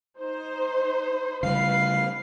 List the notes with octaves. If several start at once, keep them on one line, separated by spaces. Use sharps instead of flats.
D#4 C5
C#3 G3 B4 F5 C7